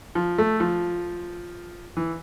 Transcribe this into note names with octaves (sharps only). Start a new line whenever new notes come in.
F3
A3
F3
E3